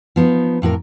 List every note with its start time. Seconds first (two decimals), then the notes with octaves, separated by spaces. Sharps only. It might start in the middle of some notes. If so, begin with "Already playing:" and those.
0.16 F3 B3 D4 D#4
0.62 F2 A2 F4 A#4